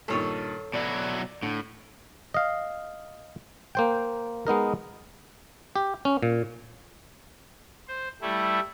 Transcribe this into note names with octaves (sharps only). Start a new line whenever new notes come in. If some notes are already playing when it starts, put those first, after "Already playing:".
G2 A#2 D#3 A4 C#5
B2 F#3 E4 D5
A2 D3
D#5 F5
A#3 C5 G5
G#3 B3 D#4 A#4
G4
C#4
A#2
C5
G3 A3 E4